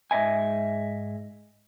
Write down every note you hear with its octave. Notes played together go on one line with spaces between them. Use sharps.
G#2 D#5 E5 G#5